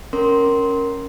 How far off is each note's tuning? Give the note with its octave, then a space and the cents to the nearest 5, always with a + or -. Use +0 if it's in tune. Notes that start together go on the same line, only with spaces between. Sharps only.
C#4 +0 A#4 +0 C6 +0